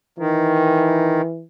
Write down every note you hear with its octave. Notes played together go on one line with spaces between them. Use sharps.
D#3 E3